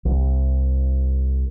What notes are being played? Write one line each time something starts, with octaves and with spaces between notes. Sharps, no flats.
C2